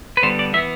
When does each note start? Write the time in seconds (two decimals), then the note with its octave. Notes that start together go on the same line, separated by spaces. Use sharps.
0.17 B4
0.23 D3 G3 B3 C5
0.39 D5
0.54 E3 E5
0.57 B3